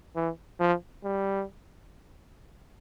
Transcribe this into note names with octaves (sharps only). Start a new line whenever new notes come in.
E3
F3
G3